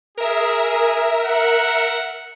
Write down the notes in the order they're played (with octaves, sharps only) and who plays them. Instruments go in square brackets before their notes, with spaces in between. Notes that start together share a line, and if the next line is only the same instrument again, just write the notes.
[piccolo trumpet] G#4 [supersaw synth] A#4 E5
[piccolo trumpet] F#5